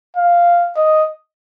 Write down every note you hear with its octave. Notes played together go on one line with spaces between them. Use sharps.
F5
D#5